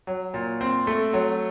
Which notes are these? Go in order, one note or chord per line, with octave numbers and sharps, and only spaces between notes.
F#3
A#2
C4
A3
F#3